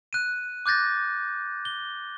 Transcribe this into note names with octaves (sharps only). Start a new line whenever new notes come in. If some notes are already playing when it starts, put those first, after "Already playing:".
F#6 D#7
D6 F#6 G6 A6 A#6
G7